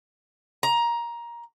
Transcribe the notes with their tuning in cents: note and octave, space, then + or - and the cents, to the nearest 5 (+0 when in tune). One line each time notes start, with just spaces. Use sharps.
A#5 +15